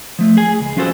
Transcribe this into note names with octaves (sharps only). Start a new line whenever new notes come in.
F3 A3
G#4 G#5
C#2
F3 C#4 F4 F#4 A4 C5